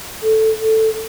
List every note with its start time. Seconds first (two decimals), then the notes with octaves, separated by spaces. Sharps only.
0.23 A4
0.62 A4